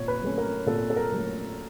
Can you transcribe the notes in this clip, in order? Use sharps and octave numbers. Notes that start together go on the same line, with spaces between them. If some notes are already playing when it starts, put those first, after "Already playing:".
Already playing: A#2 C#5
B4
F#3 A3 C#4
A#4
A#2 A4
A4
A#4
F#3 A3 C#4
C#5